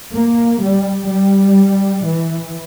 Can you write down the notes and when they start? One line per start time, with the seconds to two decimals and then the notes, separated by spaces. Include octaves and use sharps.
0.14 A#3
0.62 G3
1.09 G3
2.05 E3